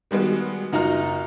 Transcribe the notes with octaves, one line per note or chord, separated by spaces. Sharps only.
D#3 G3 G#3 B3 F#4
F#1 D#4 F4 F#4 A#5 F6